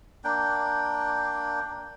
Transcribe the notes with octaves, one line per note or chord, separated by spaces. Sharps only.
A#3 D4 G5